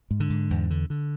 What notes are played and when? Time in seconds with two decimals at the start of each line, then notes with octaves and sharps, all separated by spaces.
0.11 G#2
0.20 D3
0.30 G#2
0.50 E2
0.70 D3
0.90 D3